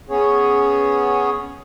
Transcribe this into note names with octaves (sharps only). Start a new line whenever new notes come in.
B3 C#4 G#4 C#5